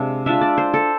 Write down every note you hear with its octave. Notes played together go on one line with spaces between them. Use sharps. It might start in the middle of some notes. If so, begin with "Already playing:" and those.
Already playing: C3 G#3 D4 F5
G#3 D4 F4 E5
D5
C5
A4